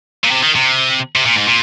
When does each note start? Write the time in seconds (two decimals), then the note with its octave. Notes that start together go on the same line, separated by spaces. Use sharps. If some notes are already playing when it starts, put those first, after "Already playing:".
0.24 A#2
0.31 C3
0.43 D#3
0.55 C3
1.16 C3
1.26 A#2
1.36 G#2
1.46 A#2